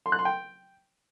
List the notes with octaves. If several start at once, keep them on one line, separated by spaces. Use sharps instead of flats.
C6
F#6
C6
G5